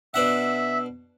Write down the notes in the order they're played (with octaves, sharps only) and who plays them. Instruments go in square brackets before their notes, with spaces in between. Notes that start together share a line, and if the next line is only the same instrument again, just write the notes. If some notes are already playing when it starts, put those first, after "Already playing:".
[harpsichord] B2 D4 F#5 [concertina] E5 [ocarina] E6